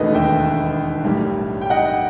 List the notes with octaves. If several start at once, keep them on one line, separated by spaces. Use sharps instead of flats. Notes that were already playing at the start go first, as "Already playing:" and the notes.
Already playing: E1 D#2 D#3 A3 B4 D#5
E5 G5
B1 A2 G3
G5
D#5 F#5